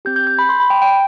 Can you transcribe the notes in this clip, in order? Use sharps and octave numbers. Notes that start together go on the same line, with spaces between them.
C4 G4 G6
G6
G6
B5
C6
B5
G5
G5